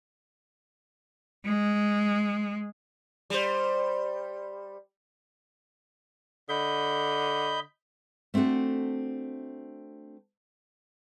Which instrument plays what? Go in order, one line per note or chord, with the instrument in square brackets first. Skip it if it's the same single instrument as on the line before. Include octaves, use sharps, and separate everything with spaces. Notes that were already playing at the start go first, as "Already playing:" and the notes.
[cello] G#3
[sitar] G3 C5
[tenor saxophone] D3 [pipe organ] D#5 B5 G6
[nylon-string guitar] A3 C4 D4 F#4 A4